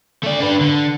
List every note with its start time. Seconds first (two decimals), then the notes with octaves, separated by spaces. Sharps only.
0.24 A3 D5
0.41 D4 B4
0.61 D3